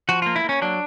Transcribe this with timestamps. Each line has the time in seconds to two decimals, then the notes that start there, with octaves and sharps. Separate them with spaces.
0.09 F3 F#4
0.22 A#3 F4
0.36 E4
0.44 A#3 C#4
0.62 F#3 D4